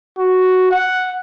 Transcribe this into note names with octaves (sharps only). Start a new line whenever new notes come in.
F#4
F#5